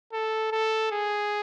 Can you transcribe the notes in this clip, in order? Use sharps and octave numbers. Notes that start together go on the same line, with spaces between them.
A4
A4
G#4